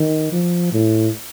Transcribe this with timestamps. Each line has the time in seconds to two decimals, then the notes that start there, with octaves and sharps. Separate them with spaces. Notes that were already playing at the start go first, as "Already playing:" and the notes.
Already playing: D#3
0.32 F3
0.72 A2